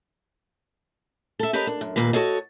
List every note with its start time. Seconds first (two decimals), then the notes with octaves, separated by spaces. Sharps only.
1.39 A4 E5
1.53 G4 A#4 B4 C#5 D#5
1.67 D4
1.81 F#2
1.96 D#2 A#2 A#3 B4
2.13 F#4 A4 C#5 D#5